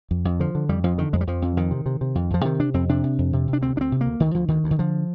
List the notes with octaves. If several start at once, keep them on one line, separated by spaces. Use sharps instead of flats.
F2
F2
D3 F3
D3
F2 G3
F2 F3
D3 D#3
F2 G#3
G3
F2 F3
F2
F2 D#3
C3
C3
C3
F2
F2 F3
C3 D#3
C3 D4
F2 C4
C3 D4
C3
F2
C3
C3
D4
D2 C4
D2 C4 D4
C3
A#3
D2
D2 D#3
D2 F3
D2 D#3
D2
D#3
D3 F3